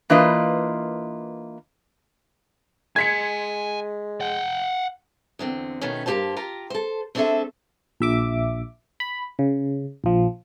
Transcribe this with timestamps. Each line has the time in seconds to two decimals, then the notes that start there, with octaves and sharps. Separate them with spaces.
0.10 E3 A#3 D4 F4 B4 D#5
2.96 G#3 G#5 C6 G#6 B6 C#7
4.21 F#5 G5
5.39 E2 D3 C4
5.81 B2 D#3 A3 B3 C#4
6.06 G2 A#3 G4 G#4 C5 A5
6.36 F4 G4 A#5
6.70 A4 C5
7.15 A3 C4 D4 G#4 A4 E5
8.01 A#1 E5 D6
9.00 B5
9.39 C#3
10.04 A#1 F3